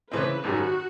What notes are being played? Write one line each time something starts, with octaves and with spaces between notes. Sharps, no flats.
C#3 E3 A3 C4 B4
G#1 F#2 D#3 G3 F#4